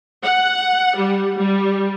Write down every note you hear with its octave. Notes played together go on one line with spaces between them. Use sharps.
F#5
G3
G3